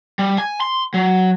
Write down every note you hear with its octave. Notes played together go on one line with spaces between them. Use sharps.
G3
G#5
C6
F#3